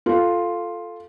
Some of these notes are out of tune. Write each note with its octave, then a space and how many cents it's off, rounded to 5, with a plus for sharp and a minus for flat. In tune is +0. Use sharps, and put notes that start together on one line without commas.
F4 +0 A4 +0